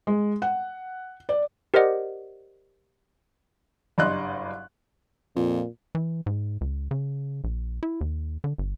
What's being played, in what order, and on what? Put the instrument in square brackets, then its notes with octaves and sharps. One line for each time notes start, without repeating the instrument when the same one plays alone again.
[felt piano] G#3
F#5
D5
[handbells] G4 A#4 C5 D5 D#5 F#5
[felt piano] F#1 G2 D5 D#5 C6 F#6
[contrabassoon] F2 [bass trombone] A#2
[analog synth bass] E3
G#2
C#2
C#3
A#1
E4
D#2
D3
G1